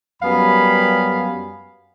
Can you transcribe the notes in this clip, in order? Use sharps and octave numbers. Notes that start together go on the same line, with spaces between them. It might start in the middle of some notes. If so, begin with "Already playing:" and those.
F#2 G3 B3 F5 G#5 B5